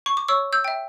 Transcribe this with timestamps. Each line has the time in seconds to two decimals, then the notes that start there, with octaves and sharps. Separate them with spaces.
0.06 C#6
0.17 D6
0.28 C#5 C#6 E6
0.53 E6 G6
0.64 E5 G5